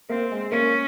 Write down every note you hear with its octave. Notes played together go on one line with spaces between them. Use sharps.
A#3 C4
G#3
A#3 C#4